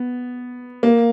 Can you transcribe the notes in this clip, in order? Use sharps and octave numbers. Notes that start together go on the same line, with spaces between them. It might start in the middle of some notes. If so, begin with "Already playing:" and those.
Already playing: B3
A#3